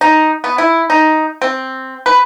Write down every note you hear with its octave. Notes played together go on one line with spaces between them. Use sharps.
D#4
B3
E4
D#4
C4
B4